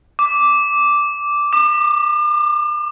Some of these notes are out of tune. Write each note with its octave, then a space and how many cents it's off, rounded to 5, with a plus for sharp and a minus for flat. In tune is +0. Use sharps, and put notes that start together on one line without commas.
D6 -5
D6 +40